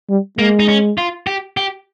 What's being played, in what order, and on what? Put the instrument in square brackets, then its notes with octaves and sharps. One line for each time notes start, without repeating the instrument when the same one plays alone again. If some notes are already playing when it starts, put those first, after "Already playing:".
[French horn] G3
[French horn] G#3 [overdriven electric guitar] A#3
[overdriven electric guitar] D#4
C#4
F4
G4
G4